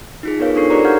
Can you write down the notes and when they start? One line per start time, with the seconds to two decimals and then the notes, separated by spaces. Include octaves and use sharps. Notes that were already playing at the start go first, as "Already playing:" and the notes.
0.23 D#4 F4 G#4
0.39 B3 F4 A#4 B4 C#5 F5
0.56 D4 D#4 A4 C#6 C7
0.70 G4 G#4 A#4 C5 D5 A#5
0.85 F5 F#5 A#5 F6 G6 G#6